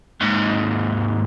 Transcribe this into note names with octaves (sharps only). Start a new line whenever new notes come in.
D#2 G#2